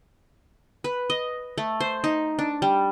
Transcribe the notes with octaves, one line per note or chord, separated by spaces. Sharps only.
B4
D#5
A3
C5
D#4
D4
G3